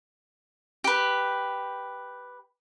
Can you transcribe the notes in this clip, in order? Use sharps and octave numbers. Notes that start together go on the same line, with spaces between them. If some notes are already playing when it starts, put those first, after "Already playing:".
G4 B4